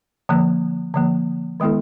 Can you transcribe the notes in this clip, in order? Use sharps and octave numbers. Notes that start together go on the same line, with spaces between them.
D3 F3 A#3
D3 F3 A#3
D#3 G#3 B3 E4 A4